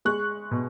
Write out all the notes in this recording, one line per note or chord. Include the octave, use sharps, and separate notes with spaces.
G#3 C#6 F#6
B2